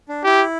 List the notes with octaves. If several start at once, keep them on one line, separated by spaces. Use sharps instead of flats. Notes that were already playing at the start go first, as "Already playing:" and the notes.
D4
E4 G4